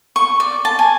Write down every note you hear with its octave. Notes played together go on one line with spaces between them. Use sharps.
C#6
D5
A5
G#5